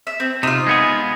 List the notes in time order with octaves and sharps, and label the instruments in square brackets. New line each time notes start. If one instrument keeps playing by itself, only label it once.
[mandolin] E5
C4
[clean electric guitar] C3 [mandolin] D#4 F4
[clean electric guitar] G#3 B3 G#4